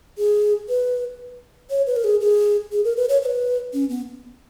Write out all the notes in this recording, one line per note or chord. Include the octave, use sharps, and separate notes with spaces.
G#4
B4
C#5
B4
A#4
G#4
G#4
G#4
A#4
B4
C#5
C#5
B4
C#4
B3